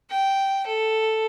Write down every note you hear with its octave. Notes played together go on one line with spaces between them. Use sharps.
G5
A4